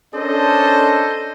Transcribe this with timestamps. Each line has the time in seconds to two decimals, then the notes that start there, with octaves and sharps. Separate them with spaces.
0.14 C#4 D4 A4 A#4 C5 D#5